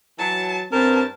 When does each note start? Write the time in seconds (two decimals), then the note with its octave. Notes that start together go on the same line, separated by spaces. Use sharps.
0.19 E3 F#3 A5
0.72 G2 C4 A#4 A5